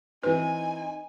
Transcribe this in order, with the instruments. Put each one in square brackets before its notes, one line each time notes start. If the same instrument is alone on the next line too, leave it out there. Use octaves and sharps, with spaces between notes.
[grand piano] E3 C4 [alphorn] D#4 [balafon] B4 [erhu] G#5